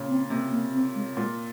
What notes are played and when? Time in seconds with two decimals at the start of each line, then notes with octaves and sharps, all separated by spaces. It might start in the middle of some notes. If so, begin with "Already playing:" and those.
Already playing: A#2 C#3
0.09 C4
0.30 C3 A#3
0.51 A#3
0.74 C4
0.95 G#3
1.17 A#2 G#3